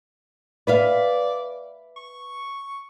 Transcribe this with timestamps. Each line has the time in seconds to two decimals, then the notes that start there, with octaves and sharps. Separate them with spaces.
0.67 B4 D5 E5 F5
1.96 C#6